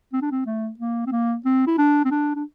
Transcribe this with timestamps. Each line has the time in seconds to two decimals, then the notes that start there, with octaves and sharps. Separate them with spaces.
0.13 C4
0.22 D4
0.31 C4
0.46 A3
0.79 A#3
1.06 C4
1.12 A#3
1.45 C4
1.67 E4
1.78 D4
2.05 C4
2.11 D4
2.35 D4